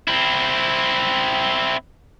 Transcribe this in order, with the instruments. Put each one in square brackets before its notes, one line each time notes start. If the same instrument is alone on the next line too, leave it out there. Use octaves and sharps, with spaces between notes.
[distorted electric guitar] C4 E4